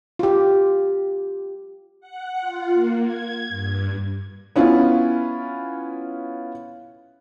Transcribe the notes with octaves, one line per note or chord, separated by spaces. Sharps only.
F4 G4
F#5
F4
A#3
G#6
G2
B3 C#4 E4 F4